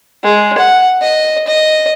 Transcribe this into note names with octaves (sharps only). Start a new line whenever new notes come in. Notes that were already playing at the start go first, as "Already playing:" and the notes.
G#3
F#5
D#5
D#5